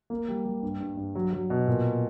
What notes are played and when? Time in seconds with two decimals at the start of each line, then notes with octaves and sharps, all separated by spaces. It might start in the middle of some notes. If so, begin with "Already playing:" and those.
0.10 A#3
0.28 G3
0.45 G3
0.62 G2
0.80 G2
0.97 G2
1.15 F#3
1.33 F#3
1.50 B2
1.68 A#2